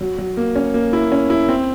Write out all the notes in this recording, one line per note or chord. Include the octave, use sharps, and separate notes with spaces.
F#3
F#3
A#3
C#4
A#3
E4
C#4
E4
C4